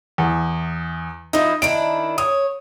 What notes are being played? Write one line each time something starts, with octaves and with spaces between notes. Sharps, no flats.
E2
F3 D#4 E4
D#3 D4 E4 D7
C#5 D#6